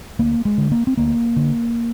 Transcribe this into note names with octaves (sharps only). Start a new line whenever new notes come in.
D2 A#3
G#3
D3
A#3
C4
D2 A#3
D3